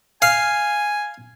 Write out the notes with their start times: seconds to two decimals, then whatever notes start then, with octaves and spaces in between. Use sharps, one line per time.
0.22 F5 G#5